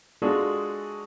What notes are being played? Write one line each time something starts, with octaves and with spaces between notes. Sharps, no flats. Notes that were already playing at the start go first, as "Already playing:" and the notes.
G#3 D4 F4 F#4 G#4 A4